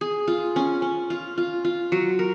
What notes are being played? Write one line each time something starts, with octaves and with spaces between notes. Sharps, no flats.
G#4
F4
C#4
C#4
F4
F4
F4
F#3
A#4